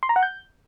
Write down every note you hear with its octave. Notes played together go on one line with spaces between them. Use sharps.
C6
A#5
F#5
G6